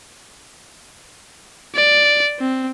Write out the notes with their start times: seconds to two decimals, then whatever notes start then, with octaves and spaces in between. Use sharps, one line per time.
1.75 D5
2.39 C4